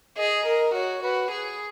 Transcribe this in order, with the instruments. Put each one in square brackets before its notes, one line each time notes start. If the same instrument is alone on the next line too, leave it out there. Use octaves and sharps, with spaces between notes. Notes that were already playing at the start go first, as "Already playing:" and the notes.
[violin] G#4 [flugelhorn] D#5
[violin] A#4
[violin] F#4 [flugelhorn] C#5
[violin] F#4 [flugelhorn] B4
[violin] G#4